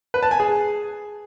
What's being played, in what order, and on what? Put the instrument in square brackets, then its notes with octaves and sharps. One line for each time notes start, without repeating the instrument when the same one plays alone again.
[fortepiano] B4
A5
G#5
G#4